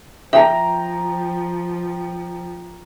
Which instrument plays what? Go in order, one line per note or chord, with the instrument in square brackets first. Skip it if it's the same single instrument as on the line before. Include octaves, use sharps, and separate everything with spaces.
[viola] F3 [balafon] E5 [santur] G5 A#5